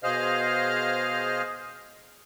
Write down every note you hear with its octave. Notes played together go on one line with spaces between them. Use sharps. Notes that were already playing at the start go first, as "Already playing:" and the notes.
B2 G#4 C5 D#5 F5 F6